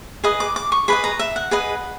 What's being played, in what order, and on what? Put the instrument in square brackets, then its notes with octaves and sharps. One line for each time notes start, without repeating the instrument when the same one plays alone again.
[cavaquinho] G#4 B4 D#5 D#6
D6
D6
C#6
G#4 B4 D#5 B5
A#5
E5
F#5
G#4 B4 D#5